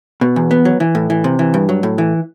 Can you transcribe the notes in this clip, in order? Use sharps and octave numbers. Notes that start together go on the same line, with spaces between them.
B2
E2
B3
F#3
E3
A2
E3
C3
E3
G2
F#3
A2
E3